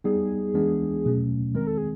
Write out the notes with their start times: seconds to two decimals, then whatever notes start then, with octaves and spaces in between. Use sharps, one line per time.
0.04 G3 B3 D#4 G#4
0.54 E3 G#3 B3 D4
1.05 B2 F#3 A3 C#4
1.55 D#3 G#3 C4 A#4
1.67 A4
1.78 G#4